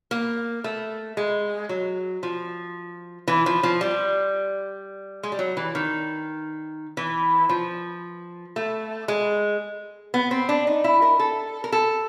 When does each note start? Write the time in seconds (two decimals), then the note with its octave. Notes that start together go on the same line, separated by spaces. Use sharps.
0.11 A#3
0.64 A3
1.17 G#3
1.69 F#3
2.23 F3
3.28 E3
3.46 F3
3.63 F3
3.81 G3
5.23 G#3
5.32 G3
5.39 F#3
5.57 E3
5.75 D#3
6.97 E3
7.49 F3
8.56 A3
9.08 G#3
10.14 B3
10.31 C4
10.49 D4
10.67 D#4
10.84 E4
11.02 A#4
11.19 A4
11.64 A#4
11.72 A4